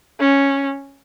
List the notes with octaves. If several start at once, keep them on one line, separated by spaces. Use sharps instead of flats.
C#4